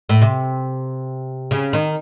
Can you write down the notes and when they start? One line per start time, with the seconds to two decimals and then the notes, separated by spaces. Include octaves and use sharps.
0.09 A2
0.22 C3
1.51 C#3
1.73 D#3